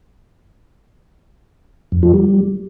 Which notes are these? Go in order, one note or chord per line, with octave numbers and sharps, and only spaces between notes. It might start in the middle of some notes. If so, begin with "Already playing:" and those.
F2
F3
G3